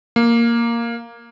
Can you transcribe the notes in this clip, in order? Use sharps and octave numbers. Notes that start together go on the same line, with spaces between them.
A#3